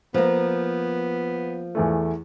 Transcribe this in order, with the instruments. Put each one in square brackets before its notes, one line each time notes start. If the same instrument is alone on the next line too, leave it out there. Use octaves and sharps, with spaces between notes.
[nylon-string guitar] F3 A#3 [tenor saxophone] B3
[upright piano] E2 E3 A3